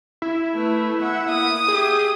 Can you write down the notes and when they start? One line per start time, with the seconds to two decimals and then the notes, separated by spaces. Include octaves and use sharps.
0.22 E4
0.55 A3 B4
1.01 E5 F#5
1.31 A#3 D#6
1.68 G4 G#4 E5